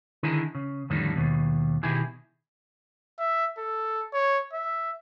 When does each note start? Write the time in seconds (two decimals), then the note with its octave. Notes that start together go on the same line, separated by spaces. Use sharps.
0.23 D3 D#3 E4 G#4 A#4
0.55 C#3
0.90 F2 A2 D3 D#3 G3
1.15 D#2 B2
1.83 B2 D#3 E4 G4 G#4
3.19 E5
3.58 A4
4.13 C#5
4.53 E5